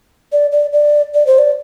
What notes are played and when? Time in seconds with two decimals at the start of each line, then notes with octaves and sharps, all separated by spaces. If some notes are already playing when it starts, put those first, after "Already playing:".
0.32 D5
0.52 D5
0.73 D5
1.14 D5
1.27 C5
1.38 D5